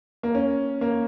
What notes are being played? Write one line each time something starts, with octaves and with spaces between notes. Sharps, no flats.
A#3
C#4
A#3